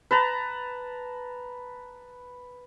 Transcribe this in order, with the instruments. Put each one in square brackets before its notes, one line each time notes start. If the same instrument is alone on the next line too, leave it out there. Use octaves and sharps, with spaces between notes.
[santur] B4 A5 A#5